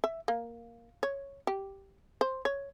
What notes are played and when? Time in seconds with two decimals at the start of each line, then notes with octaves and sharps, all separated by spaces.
0.04 E5
0.28 A#3
1.03 C#5
1.47 G4
2.21 C5
2.45 C#5